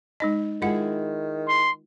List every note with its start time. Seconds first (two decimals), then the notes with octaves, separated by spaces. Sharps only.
0.20 G#3 D#4 D#5
0.62 D#3 G#3 E4 F4 G#4 F#5
1.48 C6